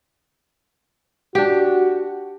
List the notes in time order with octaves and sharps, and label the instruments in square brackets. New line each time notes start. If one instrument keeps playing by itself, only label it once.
[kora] D4 G4 [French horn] F#4